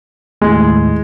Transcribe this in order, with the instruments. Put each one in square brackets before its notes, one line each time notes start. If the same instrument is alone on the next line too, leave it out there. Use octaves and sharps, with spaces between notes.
[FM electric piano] D#2 A2 [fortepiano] G#3